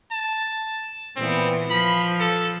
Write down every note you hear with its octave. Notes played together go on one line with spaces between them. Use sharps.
A5
A#2 E3 B3 C4
F3 B5
A4